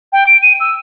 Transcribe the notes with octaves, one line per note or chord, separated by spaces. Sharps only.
G5
D7
D#7
E6